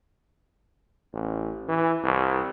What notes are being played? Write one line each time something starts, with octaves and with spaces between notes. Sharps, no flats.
A1
E3
C2